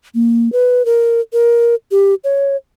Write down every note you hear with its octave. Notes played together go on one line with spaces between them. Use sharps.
A#3
B4
A#4
A#4
G4
C#5